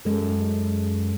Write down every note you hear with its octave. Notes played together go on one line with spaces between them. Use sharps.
F#2 G#3 A4